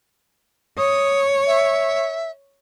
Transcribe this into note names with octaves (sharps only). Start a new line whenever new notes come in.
C#5 D#6
E5